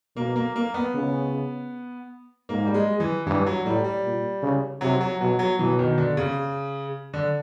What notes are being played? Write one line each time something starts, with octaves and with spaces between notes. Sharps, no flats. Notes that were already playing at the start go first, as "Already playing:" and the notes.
B2 A#3
A#3
A#3
B3
C#3
G#2 A#3
G3
G#3
E3
G2 E3
F#3
A2 G3
G3
A#2
C#3
C3 F#3
F#3
B2 F#3
F#3
B2 E3
D#3
D3
C#3
D3